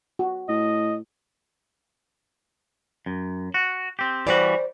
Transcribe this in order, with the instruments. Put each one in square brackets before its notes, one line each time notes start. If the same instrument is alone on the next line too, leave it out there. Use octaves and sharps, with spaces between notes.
[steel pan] F#4
[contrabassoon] A2 [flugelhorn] D#5
[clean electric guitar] F#2
F#4
C4 G4
[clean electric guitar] E3 G3 F#4 [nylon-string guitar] C5 D5